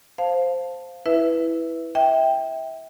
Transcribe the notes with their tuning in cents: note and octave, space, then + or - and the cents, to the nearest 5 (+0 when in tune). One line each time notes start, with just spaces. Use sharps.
C5 +0 F5 +10 A5 +0
E4 -5 B4 +0 E5 +0
E5 -25 G5 +0